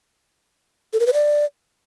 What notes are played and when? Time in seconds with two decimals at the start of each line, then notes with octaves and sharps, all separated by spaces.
0.93 A4
1.00 A#4
1.07 B4
1.13 D5